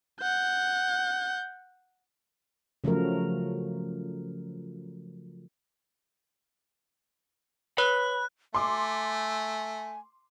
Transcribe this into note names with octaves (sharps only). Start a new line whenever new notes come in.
F#5 G6
C#3 F3 F#3 A3 A#4
B4 C#5 B5 F#6
A3 G#5 C6 D6